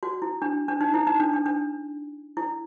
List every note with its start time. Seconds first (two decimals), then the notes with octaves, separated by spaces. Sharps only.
0.03 F#4
0.22 E4
0.42 D4
0.68 D4
0.81 D#4
0.94 E4
1.07 D#4
1.20 D4
1.33 D4
1.46 D4
2.37 E4